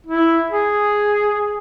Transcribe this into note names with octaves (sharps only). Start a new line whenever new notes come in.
E4
G#4